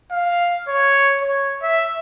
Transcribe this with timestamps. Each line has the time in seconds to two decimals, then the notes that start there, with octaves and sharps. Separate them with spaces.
0.11 F5
0.68 C#5
1.21 C#5
1.63 E5